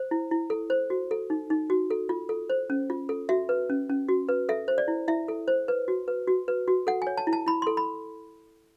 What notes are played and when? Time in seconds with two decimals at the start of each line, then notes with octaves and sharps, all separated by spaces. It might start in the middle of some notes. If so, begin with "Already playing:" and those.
Already playing: C5
0.11 E4
0.31 E4
0.50 A4
0.70 C5
0.90 F#4
1.11 A4
1.30 D#4
1.50 D#4
1.70 F#4
1.91 A4
2.09 F4
2.29 A4
2.50 C5
2.70 C#4
2.90 F4
3.09 A4
3.29 F#4 E5
3.49 B4
3.70 C#4
3.89 C#4
4.09 F#4
4.29 B4
4.49 A4 E5
4.68 C5
4.78 D5
4.88 E4
5.08 E4 E5
5.28 A4
5.48 C5
5.68 B4
5.88 F#4
6.08 B4
6.28 F#4
6.48 B4
6.68 F#4
6.87 A4 F#5
7.02 C#5 G#5
7.17 A5
7.27 E4
7.33 A5
7.47 E4 B5
7.62 A4 C6
7.77 B5